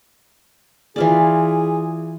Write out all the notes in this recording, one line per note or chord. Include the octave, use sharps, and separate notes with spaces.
E3 F4 G#4 D5